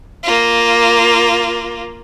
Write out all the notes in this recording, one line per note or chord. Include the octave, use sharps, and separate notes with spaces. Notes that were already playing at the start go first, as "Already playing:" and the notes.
A#3 F4